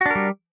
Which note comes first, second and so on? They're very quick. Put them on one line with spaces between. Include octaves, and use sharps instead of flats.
F#4 D4 A#4 G3